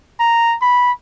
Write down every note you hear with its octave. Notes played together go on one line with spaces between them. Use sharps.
A#5
B5